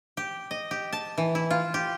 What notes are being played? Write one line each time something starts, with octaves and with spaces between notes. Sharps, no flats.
G4
D#5
G4
A5
E3
E4
F4
G4